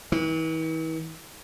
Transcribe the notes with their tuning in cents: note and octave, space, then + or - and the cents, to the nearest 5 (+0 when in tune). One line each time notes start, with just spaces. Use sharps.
E3 -40